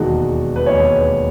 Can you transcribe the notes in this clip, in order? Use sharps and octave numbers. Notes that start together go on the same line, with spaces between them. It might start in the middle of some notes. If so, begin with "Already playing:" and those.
Already playing: E1 D#2 D#3 G#3 F#4
B4
E1 D#2 D#3 G#3 C#5
B4